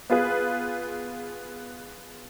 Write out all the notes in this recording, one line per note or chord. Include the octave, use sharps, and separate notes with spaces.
B3 F4 G#4 B4